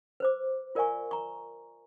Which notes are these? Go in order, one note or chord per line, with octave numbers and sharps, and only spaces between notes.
B4 C5 D6
F4 A#4 D5 F5 G#5 C#6
A#5 C#6